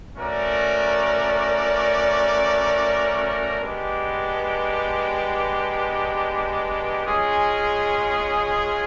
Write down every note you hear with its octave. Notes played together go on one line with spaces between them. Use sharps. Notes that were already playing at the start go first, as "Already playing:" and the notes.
A3 C#4 F#4 A#4 D5
G#3 B3 D4 G4
G#3 C#4 F4 G#4